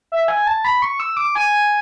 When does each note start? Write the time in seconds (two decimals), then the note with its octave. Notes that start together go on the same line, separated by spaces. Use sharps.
0.12 E5
0.28 G#5
0.47 A5
0.65 B5
0.82 C#6
1.00 E6
1.17 D6
1.35 G#5